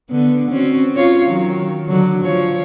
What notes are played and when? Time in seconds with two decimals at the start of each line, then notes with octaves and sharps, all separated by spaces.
0.10 D3 B3
0.49 C4 C#4 F#4
0.96 F4 C#5
1.25 D#3 F#3
1.88 D3 F#3
2.24 F3 C#5